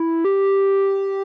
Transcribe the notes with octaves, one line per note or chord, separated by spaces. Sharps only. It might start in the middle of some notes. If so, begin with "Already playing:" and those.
Already playing: E4
G4